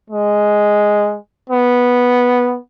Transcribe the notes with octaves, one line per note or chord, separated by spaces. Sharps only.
G#3
B3